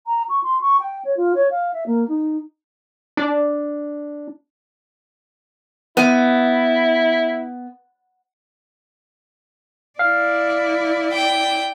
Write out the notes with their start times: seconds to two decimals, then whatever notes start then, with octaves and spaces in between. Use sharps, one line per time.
0.07 A#5
0.29 C#6
0.43 C6
0.61 C#6
0.80 G5
1.05 C#5
1.17 F4
1.35 C#5
1.51 F5
1.73 E5
1.86 A#3
2.08 D#4
3.17 D4
5.97 B3 E4
9.99 E4 D5 F5
11.13 G5